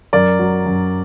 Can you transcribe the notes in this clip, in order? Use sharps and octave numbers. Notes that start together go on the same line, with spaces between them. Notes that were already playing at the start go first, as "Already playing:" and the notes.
F#2 A#4 D5
F#3
F#2